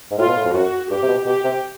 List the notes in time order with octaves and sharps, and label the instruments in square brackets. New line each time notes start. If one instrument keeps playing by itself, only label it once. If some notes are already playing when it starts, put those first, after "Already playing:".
[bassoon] G#2
[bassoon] A2 [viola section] F4
[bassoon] B2
A2
F2
[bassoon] F#2 [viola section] F#4
[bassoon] G2 [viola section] G4
[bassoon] C3
B2
[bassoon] B2 [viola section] G4
[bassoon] C3